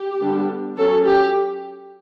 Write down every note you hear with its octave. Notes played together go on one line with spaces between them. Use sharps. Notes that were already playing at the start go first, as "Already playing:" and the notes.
Already playing: G4
D3 G3 B3 D4
F#3 C#4 A4
G4